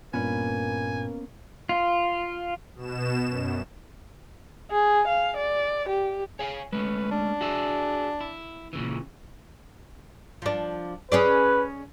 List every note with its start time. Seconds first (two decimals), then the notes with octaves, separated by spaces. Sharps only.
0.14 G2 A#2 A#3 B3 C#4 B4 G#5
1.69 F4
2.75 B2 E7
3.28 F#2
4.71 G#4
5.08 F5
5.37 D5
5.89 G4
6.39 G#4 C#5 F5 G#5
6.73 G#3 A3 C#4 B4
7.11 D4
7.41 F#4 G#4 E5
8.21 E4
8.73 A#2 C#3 E3
10.42 F3 D4
11.12 C#4 G#4 B4 D5